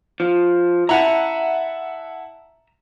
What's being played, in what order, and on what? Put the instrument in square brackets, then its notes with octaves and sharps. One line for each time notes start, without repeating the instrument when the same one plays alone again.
[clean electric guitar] F3
[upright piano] E4 F#5 A5 [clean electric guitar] E5 A#5